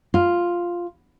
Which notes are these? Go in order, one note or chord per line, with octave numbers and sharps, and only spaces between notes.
F4